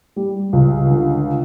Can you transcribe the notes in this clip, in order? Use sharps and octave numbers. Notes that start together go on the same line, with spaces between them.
G3
C#2
D3